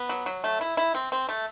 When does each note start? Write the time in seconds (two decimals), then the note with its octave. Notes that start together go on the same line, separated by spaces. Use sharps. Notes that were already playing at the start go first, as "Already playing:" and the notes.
Already playing: B3
0.09 F#3
0.26 F#3
0.44 A3
0.61 E4
0.77 E4
0.95 C4
1.12 C4
1.29 A3